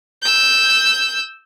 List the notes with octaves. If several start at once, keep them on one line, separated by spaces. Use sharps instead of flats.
E6 G6